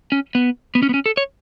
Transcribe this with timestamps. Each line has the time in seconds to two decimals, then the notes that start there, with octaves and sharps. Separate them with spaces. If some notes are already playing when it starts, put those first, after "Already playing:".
0.12 C#4
0.35 B3
0.75 B3
0.83 C#4
0.89 B3
0.94 C#4
1.06 A4
1.17 C#5